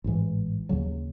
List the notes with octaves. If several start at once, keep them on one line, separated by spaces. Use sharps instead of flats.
A1 G#2 E3
D#2 C#3 F#3